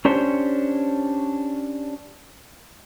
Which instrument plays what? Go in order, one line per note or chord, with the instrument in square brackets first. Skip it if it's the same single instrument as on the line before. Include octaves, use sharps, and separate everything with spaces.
[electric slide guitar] C#4 D4 G4 C5 C#5